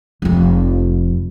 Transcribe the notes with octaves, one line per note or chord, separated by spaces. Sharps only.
F1 F2